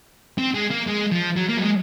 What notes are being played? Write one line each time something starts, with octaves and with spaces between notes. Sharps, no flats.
C4
G#3
A#3
G#3
F3
F#3
A#3
F#3
G#3